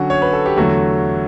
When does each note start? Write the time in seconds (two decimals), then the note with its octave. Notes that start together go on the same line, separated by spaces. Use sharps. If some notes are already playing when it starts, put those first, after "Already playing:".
Already playing: D3 F#3 C#4 F#4
0.10 C#5
0.22 B4
0.33 A4
0.46 G4
0.57 E2 D3 F#3 A3 F#4